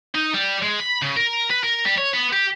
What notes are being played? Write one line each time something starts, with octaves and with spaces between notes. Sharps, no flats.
D#4
G3
G#3
B5
C#3
A#4
B4
A#4
G3
C#5
B3
G4